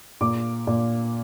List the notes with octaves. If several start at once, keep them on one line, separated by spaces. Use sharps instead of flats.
A#2 D6
A#2